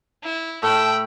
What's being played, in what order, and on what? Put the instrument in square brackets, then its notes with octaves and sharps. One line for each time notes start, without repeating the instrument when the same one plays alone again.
[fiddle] E4
[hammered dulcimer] A2 [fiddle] G5 B5 [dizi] A5 [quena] E6